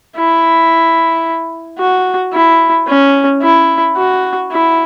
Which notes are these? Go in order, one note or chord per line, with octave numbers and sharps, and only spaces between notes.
E4
F#4
E4
C#4
E4
F#4
E4